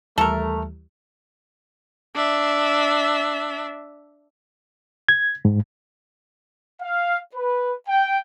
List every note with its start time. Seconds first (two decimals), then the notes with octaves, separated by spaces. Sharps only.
0.18 D#2 E3 G3 A3 A4 A#4
2.15 D4 E5
5.09 G#6
5.45 G#2
6.81 F5
7.35 B4
7.88 G5